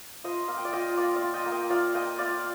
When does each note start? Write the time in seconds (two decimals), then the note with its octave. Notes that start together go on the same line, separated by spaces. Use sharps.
0.24 F4 C5 D#5
0.48 A#3 F5
0.57 G5
0.65 D5 F5
0.73 F4 D#5 G5
0.97 A#3 D5 F5
1.16 D5 F5
1.22 F4
1.34 D#5 G5
1.46 A#3
1.52 D#5 G5
1.70 F4 D5 F5
1.94 A#3 D#5 G5
2.19 F4 D5 F5